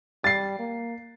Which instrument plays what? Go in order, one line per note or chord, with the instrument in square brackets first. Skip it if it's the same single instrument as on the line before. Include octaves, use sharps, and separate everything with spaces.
[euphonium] G3 [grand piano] A6 C7
[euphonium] A#3